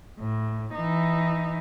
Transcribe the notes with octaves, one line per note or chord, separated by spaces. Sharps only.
A2
E3 D#4